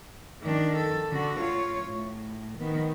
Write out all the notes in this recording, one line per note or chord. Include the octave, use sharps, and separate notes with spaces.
D#3 D4
A4
D3 F#4
F4 C#5
A2
D#3 B3